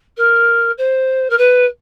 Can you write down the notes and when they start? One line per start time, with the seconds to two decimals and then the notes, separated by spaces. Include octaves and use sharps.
0.17 A#4
0.78 C5
1.30 A#4
1.38 B4